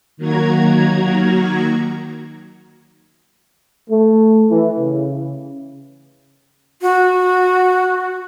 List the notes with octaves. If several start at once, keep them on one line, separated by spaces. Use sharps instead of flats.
D#3 F#3 A#3 F#4 A#5 G#6
A3
E3
C#3
F#4